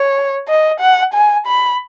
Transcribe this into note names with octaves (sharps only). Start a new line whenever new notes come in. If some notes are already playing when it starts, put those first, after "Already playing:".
Already playing: C#5
D#5
F#5
G#5
B5